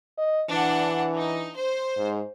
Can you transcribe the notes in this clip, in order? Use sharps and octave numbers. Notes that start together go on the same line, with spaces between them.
D#5
E3 D4 F#5
D#4
C5
G#2